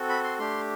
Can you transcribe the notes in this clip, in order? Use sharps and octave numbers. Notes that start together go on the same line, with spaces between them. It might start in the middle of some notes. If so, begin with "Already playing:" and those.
Already playing: C4 F#4 A4
B5
C6
A3 D4 G4 C6